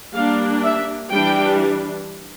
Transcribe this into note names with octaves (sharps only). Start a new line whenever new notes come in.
G3 A#3 D4 F5
E5
E3 G3 D4 G5